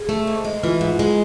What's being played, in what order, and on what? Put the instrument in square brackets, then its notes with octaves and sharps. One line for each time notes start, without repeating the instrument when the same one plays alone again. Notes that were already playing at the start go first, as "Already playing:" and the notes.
Already playing: [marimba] G#4
[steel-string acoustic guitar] A3
G#2
G#3
[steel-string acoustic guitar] E3 [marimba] F4
[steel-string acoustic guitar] G#2
G#3